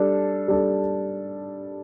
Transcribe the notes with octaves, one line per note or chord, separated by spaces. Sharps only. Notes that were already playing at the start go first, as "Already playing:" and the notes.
Already playing: G3 D4 A4
G3 D4 A4